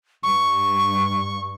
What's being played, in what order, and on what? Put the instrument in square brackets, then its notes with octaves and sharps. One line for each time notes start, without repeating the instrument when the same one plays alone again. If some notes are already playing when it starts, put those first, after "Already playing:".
[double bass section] G2 [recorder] C#6